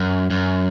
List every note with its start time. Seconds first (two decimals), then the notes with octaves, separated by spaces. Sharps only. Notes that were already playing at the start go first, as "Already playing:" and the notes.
Already playing: F#2
0.30 F#2